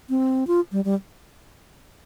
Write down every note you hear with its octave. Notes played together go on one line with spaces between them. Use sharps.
C4
F4
G3
G3